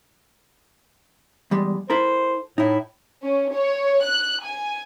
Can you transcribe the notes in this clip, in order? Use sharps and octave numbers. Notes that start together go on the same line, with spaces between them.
E2 G3 G#3
E4 A4 A#4 C5
A2 D#4 E4
C#4
C#5
F#6
G#5